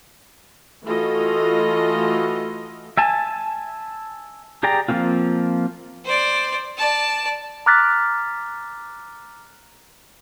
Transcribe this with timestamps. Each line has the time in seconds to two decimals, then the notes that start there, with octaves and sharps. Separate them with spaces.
0.85 E3 A3 F4 F#4 A4 D#5
2.97 E5 G#5 A5
4.63 G4 G#4 D5 G5 A#5
4.88 F3 G3 A#3 C4 F4
6.05 C5 D5
6.77 D5 A5
7.66 A#5 D6 F6 F#6 A6 B6